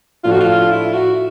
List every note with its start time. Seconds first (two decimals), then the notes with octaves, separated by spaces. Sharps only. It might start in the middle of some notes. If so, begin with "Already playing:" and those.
0.24 A2 F3 A3 D4 F4
0.32 F#4
0.41 F4
0.71 E4
0.94 F#4